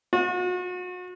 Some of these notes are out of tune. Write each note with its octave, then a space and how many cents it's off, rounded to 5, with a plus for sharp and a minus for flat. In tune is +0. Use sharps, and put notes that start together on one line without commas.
F#4 -40